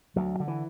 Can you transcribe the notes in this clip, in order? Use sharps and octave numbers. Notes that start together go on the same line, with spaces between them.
D2 F#3
D3
E3